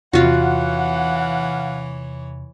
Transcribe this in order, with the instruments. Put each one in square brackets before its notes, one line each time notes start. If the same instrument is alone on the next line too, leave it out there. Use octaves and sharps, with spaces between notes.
[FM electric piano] E2 C3 [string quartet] E3 C#5 [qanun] F4 F#4 [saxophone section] F5 F#5